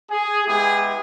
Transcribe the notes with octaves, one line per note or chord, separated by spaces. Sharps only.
G#4
G#3 B3 E4 G4 G#4